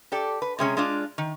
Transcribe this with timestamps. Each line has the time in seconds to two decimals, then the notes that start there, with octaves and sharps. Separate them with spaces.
0.12 G4 A4 D5
0.42 B4
0.59 C3 G#3 C#4 G#4
0.77 G#3 D4 F4
1.18 D#3